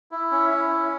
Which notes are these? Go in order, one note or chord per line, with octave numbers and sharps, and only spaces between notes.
E4
C#4
E4
C#4